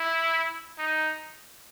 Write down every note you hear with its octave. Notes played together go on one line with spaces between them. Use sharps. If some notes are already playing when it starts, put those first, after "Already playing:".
Already playing: E4
D#4